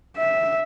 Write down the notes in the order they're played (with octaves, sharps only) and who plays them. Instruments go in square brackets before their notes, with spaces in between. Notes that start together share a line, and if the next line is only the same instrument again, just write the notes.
[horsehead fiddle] E5